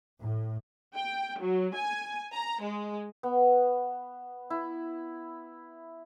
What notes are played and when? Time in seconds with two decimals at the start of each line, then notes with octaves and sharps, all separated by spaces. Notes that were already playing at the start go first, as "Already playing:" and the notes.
0.21 A2
0.94 G5
1.40 F#3
1.75 G#5
2.33 A#5
2.62 G#3
3.23 B3
4.50 E4